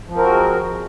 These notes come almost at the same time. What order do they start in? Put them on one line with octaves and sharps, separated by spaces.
F3 C4 A#4 F#4 G#3